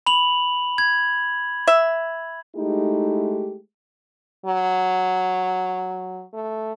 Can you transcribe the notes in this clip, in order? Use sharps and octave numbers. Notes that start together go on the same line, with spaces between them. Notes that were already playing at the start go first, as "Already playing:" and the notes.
B5 F7 F#7
G#6
E5
G#3 A3 D#4 E4 G4
F#3
A3